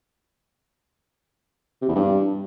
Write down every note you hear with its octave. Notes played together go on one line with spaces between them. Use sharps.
C3
E2
G2